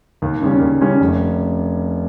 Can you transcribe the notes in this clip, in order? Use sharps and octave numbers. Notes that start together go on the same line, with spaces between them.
D#2
C#3 G3 C#4
D#2
C#3 G3 C#4
F1